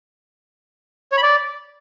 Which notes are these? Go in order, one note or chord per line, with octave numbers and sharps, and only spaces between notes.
C#5
B5
D5